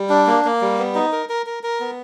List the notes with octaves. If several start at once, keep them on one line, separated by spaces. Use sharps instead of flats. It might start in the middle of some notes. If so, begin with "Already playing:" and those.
Already playing: G3
D4
A#3
A#3
G3
B3
D#4
A#4
A#4
A#4
A#4
B3